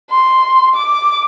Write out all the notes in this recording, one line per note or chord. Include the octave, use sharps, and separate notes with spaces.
C6
D6